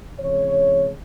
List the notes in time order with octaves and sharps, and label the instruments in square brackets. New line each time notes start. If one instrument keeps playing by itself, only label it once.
[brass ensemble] C3 E3 G#3 C#4 C#5